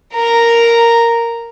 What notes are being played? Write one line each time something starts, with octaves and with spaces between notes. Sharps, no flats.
A#4 A#5